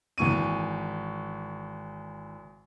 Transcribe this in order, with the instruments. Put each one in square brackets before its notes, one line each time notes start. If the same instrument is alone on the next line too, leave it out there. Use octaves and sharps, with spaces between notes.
[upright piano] G#1 E3 C#6 D#7